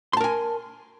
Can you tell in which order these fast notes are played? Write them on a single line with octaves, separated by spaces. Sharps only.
C6 A5 A#4 G#5